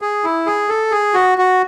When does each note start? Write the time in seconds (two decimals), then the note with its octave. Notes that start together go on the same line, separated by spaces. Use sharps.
0.02 G#4
0.24 E4
0.46 G#4
0.69 A4
0.91 G#4
1.14 F#4
1.38 F#4